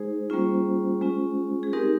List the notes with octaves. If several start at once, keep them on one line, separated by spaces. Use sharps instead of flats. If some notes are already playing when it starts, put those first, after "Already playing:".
Already playing: G#3 D#4 G#4 C5
G3 A#3 C#4 F4
G#3 C#4 F4
G#4
G#3 C4 D#4 G4 A#4